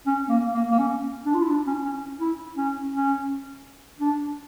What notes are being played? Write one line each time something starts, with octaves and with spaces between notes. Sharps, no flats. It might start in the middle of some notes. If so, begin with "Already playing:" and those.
C#4
A#3
A#3
A#3
C#4
D4
F4
E4
D4
C#4
C#4
E4
C#4
C#4
D4